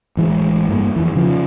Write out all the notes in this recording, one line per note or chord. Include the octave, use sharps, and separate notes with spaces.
A1 E3 G#3
G2 A3 A#3
F2 E3
C#3 F3